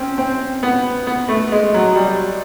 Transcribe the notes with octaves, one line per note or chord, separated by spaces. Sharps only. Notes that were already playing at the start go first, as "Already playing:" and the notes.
Already playing: C4 C#4
C4
B3
B3
A3
G#3
F#3
G3